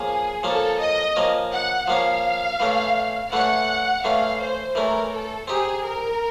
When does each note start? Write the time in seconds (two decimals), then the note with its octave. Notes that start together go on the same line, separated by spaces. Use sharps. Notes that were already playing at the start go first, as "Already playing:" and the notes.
Already playing: F3 A#3 C#4 G#4
0.43 F3 A#3 C#4 A4
0.80 D#5
1.16 F3 A#3 C#4
1.51 F#5
1.87 F3 A#3 C#4 F5
2.60 E3 A3 C#4
3.32 E3 A3 C#4 F#5
4.03 E3 A3 C#4 F5
4.40 C5
4.75 E3 A3 C#4 A#4
5.12 A4
5.48 C4 D#4 G4 G#4
5.84 A#4